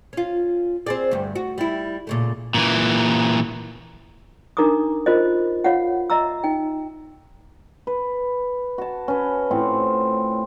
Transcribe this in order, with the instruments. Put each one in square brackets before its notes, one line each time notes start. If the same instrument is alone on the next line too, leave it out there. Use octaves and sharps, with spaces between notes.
[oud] C#4 F4
C4 G#4 D5
D2 G2
F#4
G3 E4
A#2 C#3 A3
[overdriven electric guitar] A#2 E3
[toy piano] D4 D#4 A#4 A#5 D6 D#6
F4 A#4 C5 D#5
F4 C#5 F5 F#5
D#5 E5 A#5 E6
D#4 G5
[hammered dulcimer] B4
F#4 A5
C#4 B4
A2 C4 F4 F#5